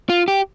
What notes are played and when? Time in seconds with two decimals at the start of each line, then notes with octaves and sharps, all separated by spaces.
0.10 F4
0.28 G4